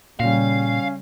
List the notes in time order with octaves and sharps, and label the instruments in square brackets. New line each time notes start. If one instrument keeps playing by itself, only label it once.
[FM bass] A#2 [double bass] C#3 G3 [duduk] C#4 [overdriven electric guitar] F5